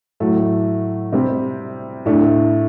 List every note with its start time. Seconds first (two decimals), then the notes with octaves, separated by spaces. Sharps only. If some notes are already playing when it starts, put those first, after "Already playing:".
0.20 A2 F#3 A3
1.13 C3 G3 C4
2.06 A2 A3 D4